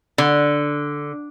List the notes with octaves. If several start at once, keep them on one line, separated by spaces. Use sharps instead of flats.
D3